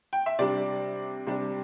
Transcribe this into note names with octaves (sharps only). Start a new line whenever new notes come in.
G5
E5
C3 G3 D4 D5
C3 G3 D4